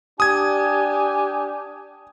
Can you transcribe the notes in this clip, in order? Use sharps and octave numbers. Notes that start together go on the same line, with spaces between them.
D4 G4 G#5 D#6 G#6